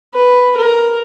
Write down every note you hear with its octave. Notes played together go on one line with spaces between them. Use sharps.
B4
A#4